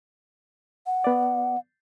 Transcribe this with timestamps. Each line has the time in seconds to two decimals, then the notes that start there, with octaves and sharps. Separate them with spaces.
0.86 F#5
1.04 B3 D5